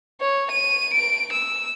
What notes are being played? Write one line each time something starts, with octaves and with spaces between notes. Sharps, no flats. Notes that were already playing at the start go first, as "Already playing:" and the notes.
C#5
D#7
D7
E6